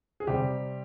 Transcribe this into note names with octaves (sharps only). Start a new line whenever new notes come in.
G#4
C3 G3 G4